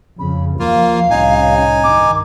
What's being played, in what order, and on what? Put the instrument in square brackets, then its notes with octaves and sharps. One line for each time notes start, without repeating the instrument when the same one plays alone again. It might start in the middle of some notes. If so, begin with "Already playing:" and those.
[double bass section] F2 C#3 [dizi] B5
[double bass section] D#2 F3 [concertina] A#3 F4 [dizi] F5
[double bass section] C2 A2 C#4 [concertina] D#4 G#5
[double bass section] G2 D#3 [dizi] D6